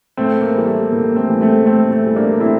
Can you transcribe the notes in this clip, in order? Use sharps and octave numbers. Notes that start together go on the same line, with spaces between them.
A2 A3 C4
A#3
E3 G3
A3
A2 A#3
A3 C4
E3 G3
A3 C4
A2 A3 C4
A3
E3 G3
A#3 D4
A2 C4 E4